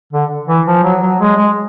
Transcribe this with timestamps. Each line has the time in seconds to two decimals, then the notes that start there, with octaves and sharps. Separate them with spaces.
0.13 D3
0.48 E3
0.66 F3
0.83 F#3
1.01 F#3
1.20 G#3
1.37 G#3